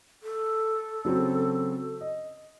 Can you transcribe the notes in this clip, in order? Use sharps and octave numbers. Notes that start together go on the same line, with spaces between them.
A4
C#3 F#3 C4
D#5